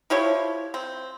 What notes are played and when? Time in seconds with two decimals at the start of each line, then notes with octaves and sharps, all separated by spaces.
0.10 F3 E4 G4 C#5
0.74 C4